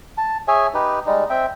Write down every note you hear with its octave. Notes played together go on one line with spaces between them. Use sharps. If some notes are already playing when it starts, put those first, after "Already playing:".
A5
G#4 C#5 E5 G#5
D#4 G4 B4
G3 G#3 D#4
C4 E5 G5